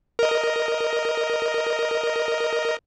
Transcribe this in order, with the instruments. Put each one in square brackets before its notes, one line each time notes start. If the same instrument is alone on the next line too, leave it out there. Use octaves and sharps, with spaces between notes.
[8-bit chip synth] A#4 D#5